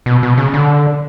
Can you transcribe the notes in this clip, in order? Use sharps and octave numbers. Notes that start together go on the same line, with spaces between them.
B2
B2
C#3
D3